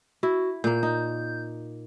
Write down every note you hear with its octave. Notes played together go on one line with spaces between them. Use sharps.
E4 F#4
A#2 A#3 G6
D#4